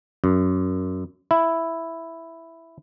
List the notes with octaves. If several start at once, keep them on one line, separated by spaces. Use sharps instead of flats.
F#2
E4